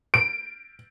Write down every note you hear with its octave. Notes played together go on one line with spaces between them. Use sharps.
D7